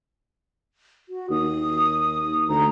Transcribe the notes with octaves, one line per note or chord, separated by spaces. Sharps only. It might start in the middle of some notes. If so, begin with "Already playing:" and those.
F#4
D#2 D#6
D2 A#5